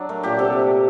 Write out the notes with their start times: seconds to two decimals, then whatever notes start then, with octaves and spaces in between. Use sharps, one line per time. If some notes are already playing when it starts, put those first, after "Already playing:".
Already playing: F#3 D4
0.09 A3 A#4
0.23 A#2 G4
0.39 C3 A4